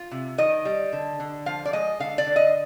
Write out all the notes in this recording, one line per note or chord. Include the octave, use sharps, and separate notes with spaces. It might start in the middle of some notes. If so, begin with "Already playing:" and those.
Already playing: F4
C3
D#3 D#5
G3
D3
D3
F3 F5
D5
G#3 D#5
D3 F5
D5
D3
D#5